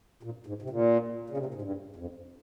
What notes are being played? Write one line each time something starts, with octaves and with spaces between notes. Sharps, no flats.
A#2
G#2
C3
A#2
C#3
C3
A#2
G#2
G2
F2